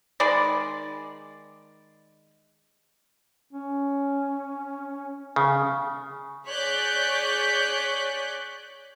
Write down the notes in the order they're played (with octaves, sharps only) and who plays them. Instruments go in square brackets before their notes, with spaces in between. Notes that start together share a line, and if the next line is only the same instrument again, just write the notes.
[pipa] D#3 G#3 D5 B5
[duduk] C#4
[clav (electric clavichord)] C#3
[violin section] G#4 C#5 D5 F#6 G6 B6